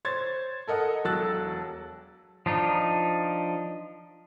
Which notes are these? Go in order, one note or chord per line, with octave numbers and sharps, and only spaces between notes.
C5 C#5 G#6 A6
A4 A#4 D#5 F#5 D#6
E1 F#3 A4 E6 F#6 A6
F3 D4 D#4